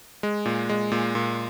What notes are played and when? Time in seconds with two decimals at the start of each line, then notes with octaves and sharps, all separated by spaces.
0.23 G#3
0.46 A#2
0.69 G#3
0.92 A#2
1.15 A#2